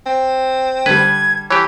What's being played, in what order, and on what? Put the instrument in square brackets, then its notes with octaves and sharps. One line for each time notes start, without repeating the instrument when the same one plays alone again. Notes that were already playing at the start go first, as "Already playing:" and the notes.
[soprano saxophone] C4
[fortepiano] D3 G3 [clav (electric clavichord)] B4 [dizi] G#6
[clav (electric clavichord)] E3 G4 [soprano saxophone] C#5 [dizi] A5